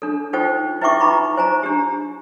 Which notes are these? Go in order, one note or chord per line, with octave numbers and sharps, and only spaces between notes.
D4 A4
D#4 F4 A4 C5 G5
E4 B4 E5 G5 C#6 D6
D#4 F4 A#5 B5 C#6
C5 G#5 A#5
D4 G4